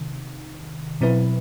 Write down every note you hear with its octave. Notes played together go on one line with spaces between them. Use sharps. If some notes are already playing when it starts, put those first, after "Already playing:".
Already playing: C3 D#3
B2 F#3 C4 E4 B4